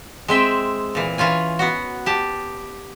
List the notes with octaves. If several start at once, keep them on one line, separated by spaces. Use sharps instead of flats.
G#3 C4 E5 G5
A#2 E3
E3 C#4 F4 G#5
B3 F#4
G4 A5